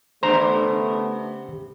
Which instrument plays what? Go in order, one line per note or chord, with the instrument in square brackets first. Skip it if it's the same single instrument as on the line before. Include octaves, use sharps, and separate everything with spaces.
[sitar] C#3 D4 G4 [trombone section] A3 B3 [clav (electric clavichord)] C5 A#5